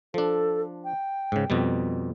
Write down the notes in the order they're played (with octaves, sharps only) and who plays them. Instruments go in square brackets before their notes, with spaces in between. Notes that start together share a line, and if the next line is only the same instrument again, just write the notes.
[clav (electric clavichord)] F3 D4 [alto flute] A4
[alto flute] G5
[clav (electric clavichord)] G#2 C#3
F2 B2 G3